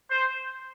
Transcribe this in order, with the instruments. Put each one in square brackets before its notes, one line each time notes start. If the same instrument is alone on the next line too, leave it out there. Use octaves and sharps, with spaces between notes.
[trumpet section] C5